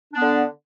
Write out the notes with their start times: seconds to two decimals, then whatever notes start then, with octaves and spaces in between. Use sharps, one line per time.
0.14 D4
0.17 B3
0.21 D3